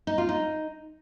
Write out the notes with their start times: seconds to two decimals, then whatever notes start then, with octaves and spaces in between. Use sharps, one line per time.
0.07 D#4
0.18 F4
0.29 D#4